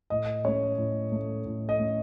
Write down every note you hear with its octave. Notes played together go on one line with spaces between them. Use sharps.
A2 D#5
A3 C#4 C#5
A2
A3 C#4
A2
D#5
A3 C#4